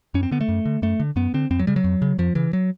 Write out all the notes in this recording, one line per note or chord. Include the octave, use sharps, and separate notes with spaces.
F#2 C#4
C4
D3 B3
A3
F#2
D3
F#2 A3
D3
F#2 B3
D3 C4
F2 C4
F#3
C#3 G3
F#3
F2
C#3
F2 F3
C#3 E3
F#3